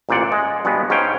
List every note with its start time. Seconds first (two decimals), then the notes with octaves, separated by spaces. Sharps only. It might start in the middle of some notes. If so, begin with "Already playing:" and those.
0.09 A1 A#2 C5 D5 F#5
0.32 G#3
0.65 G2 B2 G#3 B3
0.90 G#2 C#4 F5 G5